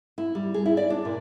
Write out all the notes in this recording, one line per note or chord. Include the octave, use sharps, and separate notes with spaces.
E4
G3
G#4
E4
D5
D4
A#2